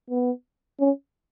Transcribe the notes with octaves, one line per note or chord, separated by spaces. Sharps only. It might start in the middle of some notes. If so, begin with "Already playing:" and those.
B3
C#4